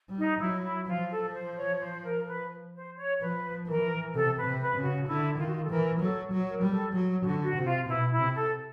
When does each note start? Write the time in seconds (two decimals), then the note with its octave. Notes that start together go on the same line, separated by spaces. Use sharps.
0.09 G3
0.17 D#4
0.40 F#3 E4
0.64 E4
0.87 F3 F4
1.10 A4
1.34 C5
1.56 C#5
1.80 C5
2.04 A#4
2.28 B4
2.74 C5
2.97 C#5
3.21 F3 B4
3.67 E3 A#4
4.14 C3 A4
4.38 B4
4.45 C3
4.61 B4
4.77 C#3
4.84 F#4
5.07 D3 E4
5.39 D#3 F4
5.46 F#4
5.55 F4
5.63 A4
5.70 E3 A#4
6.00 F#3 A4
6.32 F#3
6.47 A#4
6.63 G3
6.71 A4
6.94 F#3
7.18 F#4
7.26 D3
7.42 F#4
7.57 C3
7.65 F4
7.88 B2 E4
8.12 E4
8.19 C3
8.35 A4